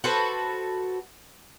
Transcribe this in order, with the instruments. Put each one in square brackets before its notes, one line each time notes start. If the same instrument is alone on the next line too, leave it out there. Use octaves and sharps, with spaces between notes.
[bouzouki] F#4 A4 B4 C5